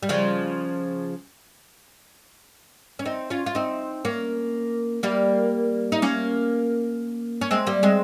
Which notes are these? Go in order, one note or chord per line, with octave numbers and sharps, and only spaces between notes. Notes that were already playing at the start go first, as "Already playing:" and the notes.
G3
C#3 F3
C#4
C4 D#4
C#4 F4
F4
C4 D#4
A#3 C#4
G3 A#3
D#4
A#3 C#4
C#4
G#3 C4
G3 A#3
G#3 C4